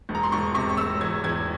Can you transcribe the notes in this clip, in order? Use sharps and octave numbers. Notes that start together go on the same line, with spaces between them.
E1
A#5
C6
E1 C#6
C3 C#6
C#6
E1 E6
E2 G#6
E2 G#6